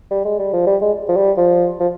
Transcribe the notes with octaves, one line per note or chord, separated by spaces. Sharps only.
G3
G#3
G3
F3
G3
G#3
F3
G3
F3
F3